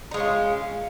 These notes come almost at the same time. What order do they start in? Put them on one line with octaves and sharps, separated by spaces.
D#4 G#3 C#4 F4